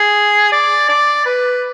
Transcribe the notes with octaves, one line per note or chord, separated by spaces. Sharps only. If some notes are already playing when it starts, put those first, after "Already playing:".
Already playing: G#4
D5
D5
B4